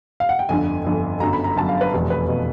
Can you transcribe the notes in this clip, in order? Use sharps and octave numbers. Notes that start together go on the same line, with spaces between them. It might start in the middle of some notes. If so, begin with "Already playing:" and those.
F5
F#5
G5
G1 F2 D3 G#5
G1 F2 D3
G1 F#2 D3 F#3 A#5
B5
A#5
G1 F#2 D3 F#3 A5
F5
B4
F1 E2 B2
B4
B2